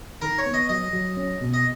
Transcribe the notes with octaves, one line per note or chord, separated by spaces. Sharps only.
D#3 A#4
C#5
B3
D#5
F#3 D#5
F#3
C#4
B2
D#5